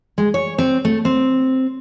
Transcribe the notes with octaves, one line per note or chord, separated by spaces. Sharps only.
G#3
C#5
C4
A3
C4